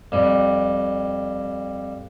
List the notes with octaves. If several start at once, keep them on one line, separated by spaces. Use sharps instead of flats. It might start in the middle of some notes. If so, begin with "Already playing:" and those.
F2 G3